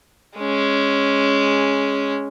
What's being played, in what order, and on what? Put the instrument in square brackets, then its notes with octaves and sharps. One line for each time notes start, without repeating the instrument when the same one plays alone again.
[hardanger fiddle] G#3 C#4